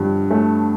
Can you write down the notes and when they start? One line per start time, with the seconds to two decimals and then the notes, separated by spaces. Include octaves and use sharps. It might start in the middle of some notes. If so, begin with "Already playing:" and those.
Already playing: G2 D3 F3
0.31 A3